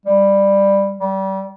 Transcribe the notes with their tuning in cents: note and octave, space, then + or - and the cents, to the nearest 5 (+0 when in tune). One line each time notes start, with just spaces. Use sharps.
G3 +10
G3 -30